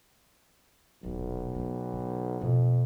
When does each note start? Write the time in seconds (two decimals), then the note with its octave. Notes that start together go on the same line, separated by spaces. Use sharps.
1.03 D#1 B1 C4
1.55 A3 B3
1.93 D3
2.41 F2 B2